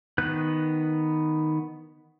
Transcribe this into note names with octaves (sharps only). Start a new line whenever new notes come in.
D#3 B3 B4 F#6